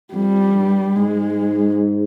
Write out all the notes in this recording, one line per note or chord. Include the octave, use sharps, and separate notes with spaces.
F2 G3
G2
G#2 G#3